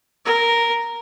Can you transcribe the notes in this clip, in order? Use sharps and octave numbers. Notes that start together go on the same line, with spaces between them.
A#4